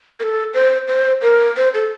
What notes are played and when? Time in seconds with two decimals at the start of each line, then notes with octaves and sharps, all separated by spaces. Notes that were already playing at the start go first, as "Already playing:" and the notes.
0.20 A#4
0.23 A4
0.54 C5
0.88 C5
1.22 A#4
1.57 C5
1.74 A4